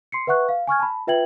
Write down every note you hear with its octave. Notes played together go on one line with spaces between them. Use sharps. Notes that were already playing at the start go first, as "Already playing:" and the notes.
C6 C7 C#7
B4 E5 F#5 C#6 F#6
F5
G#5 C#6 F6 G#6
A5 B5
F4 B4 E5 G5 G#6 F#7